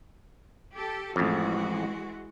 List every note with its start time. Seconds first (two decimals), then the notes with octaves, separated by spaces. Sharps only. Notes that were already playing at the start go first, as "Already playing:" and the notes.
0.75 G4 A4
1.16 A1 F2 E3 G#3 F#4